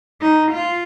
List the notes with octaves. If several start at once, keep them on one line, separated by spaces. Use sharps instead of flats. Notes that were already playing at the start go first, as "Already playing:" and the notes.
D#4
F4